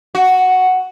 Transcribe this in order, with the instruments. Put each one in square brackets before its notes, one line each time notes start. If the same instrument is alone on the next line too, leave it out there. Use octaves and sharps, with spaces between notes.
[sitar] F#4